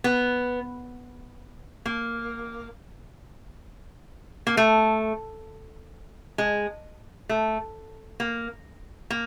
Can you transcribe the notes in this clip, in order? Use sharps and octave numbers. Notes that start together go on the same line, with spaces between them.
B3
A#3
A#3
A3
G#3
A3
A#3
A#3